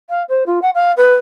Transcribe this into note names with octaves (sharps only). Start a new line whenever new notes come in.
F5
C5
F4
F#5
F5
B4